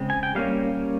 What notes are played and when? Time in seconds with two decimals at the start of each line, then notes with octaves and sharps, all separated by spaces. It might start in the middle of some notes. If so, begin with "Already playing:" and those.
Already playing: C#3 G#3 C4
0.10 G#5
0.23 G5
0.35 G3 A#3 C#4 F5